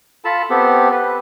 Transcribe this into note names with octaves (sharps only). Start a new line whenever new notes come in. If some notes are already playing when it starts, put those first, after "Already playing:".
F4 A4 A5 B5
B3 C4 G4 A4
B4